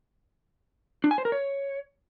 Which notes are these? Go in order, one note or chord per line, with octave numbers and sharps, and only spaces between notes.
D4
G#5
C5
A#4
C#5